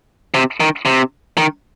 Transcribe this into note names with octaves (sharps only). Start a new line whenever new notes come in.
C3
D#3
C3
D#3